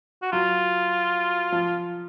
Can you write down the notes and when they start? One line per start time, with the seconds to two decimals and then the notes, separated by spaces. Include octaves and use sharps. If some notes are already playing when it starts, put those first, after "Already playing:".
0.22 F#4
0.32 F#3 F4
1.52 F3